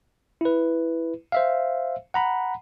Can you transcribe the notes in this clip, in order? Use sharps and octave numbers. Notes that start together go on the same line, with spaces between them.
E4 B4
C5 E5 F5
F#5 A#5 B5